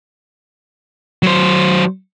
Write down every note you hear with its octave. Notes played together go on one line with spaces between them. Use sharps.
F#3 C5